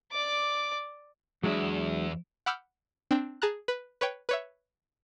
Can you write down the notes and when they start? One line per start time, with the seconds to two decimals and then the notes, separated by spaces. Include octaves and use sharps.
0.12 D5 D6
1.43 E2 F#3 G#3 D4 E4
2.46 F#5 B5 D6 E6 F6 G6
3.11 C4 D4 G5
3.42 G#4 A5 A#5 F#6
3.68 B4
4.01 B4 C#5 G5
4.29 B4 C#5 E5